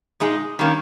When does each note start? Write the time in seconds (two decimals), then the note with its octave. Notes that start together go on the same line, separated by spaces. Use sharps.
0.20 A#2 G#3 D#4 G#4
0.59 D#3 G3 A#3 C#4